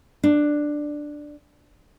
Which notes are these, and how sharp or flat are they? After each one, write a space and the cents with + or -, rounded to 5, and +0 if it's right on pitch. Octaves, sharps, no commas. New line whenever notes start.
D4 +5